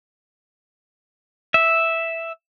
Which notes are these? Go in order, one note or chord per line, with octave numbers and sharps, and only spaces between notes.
E5